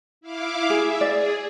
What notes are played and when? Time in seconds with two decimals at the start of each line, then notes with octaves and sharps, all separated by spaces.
0.21 E4 F5 D6
0.70 G#4 E5
1.01 G#4 D5